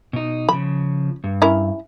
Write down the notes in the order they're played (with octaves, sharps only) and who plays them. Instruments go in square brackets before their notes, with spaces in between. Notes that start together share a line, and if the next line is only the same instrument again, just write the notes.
[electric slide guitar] B2 D#4
[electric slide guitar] C#3 F3 [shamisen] B5
[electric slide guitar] G2
[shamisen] C#4 E4 A#4